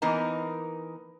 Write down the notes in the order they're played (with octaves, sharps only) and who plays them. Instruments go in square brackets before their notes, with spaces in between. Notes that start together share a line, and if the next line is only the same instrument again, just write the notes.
[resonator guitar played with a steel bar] E3 A#3 B3 D#4 A#4 A#5